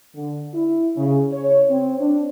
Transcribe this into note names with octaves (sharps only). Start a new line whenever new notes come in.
D3
E4
C#3
C#5
C4
D4